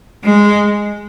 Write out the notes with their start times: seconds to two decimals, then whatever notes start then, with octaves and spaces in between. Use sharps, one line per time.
0.24 G#3